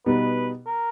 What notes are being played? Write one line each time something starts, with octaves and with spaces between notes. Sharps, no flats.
B2 G3 B3 D#4 B4
A#4